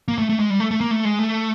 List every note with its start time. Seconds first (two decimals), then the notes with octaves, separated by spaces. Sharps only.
0.08 A#3
0.18 A3
0.29 A3
0.39 G#3
0.50 G3
0.60 A3
0.71 A3
0.81 A#3
0.91 A3
1.05 G#3
1.19 A3